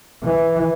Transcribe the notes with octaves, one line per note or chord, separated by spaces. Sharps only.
E3